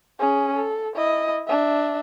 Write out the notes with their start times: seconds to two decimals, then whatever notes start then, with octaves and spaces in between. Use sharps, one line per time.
0.19 C#4 G#4
0.56 A4
0.96 E4 D#5
1.47 D4 E5